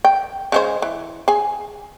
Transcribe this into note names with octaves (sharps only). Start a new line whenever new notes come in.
G5
C#3 G#3 C5
E3
G#4 G#5